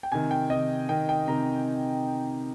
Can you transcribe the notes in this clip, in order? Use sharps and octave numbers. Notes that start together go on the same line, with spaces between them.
G5
C3 D#3 G#5
G5
C3 D#3 D#5
C3 D#3 G5
G5
C3 D#3 A#5